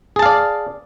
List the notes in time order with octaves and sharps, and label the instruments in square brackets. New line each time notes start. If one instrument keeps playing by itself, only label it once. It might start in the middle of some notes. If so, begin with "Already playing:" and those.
[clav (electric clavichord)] G#4
A5
F5
D5